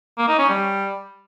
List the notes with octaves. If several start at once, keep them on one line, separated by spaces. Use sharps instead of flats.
A#3
D#4
C#4
G3